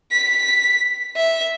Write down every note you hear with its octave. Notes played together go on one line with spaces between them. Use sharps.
B6
E5